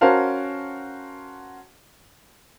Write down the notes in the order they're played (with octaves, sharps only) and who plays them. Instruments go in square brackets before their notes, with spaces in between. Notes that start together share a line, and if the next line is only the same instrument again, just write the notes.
[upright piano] C#4 F#4 A#4 C5 F5 A5